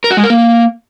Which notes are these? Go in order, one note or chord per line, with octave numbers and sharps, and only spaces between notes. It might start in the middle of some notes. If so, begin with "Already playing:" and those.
A#4
F#4
G#3
A#4
A#3